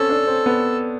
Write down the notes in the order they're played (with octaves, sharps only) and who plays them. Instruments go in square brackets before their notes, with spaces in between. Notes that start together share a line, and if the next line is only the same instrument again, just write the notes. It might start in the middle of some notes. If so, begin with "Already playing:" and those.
Already playing: [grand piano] C4 C#4 [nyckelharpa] A4
[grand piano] D4
C4
B3